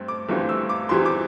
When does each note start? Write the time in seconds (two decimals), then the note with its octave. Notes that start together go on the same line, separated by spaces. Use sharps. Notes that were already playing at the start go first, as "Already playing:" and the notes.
Already playing: G2 A3 C4
0.08 D6
0.29 G1 G2 E3 A3 C4
0.49 E6
0.69 D6
0.89 E2 E3 G3 C4 C6
1.05 D6